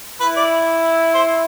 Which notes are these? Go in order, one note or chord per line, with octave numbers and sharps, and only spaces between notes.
E4 B4
D5
C5